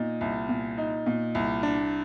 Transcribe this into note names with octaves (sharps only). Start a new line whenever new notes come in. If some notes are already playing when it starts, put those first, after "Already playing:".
Already playing: A#2 D#4
C2
A#2
D#4
A#2
C2
D4